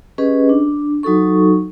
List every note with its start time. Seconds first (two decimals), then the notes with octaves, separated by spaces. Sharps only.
0.18 C#4 G4 G#4 B4 D#5
0.49 D4
1.03 F#3 D#4 F#4 A4 C#6